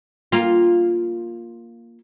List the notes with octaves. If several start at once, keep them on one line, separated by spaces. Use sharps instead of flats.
A#3 F4